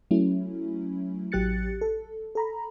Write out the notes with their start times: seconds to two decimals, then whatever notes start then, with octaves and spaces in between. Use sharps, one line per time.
0.11 F#3 A3 C#4 E4
1.32 A1 F#3 G4 F#6 A6 C#7
1.81 A4
2.35 A4 A#5 B5